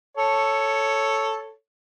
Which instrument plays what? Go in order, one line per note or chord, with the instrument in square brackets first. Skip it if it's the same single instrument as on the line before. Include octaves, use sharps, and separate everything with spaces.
[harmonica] A4 C#5